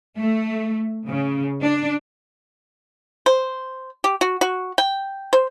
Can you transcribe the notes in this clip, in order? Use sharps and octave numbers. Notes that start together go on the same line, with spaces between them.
A3
C#3
D4
C5
G4
F#4
F#4
G5
C5